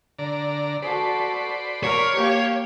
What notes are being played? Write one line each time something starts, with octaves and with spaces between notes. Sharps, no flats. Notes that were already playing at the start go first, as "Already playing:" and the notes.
D3 D5 A#5
F#4 A4 B4 C5 D5
A#4 C#5
A#3 G4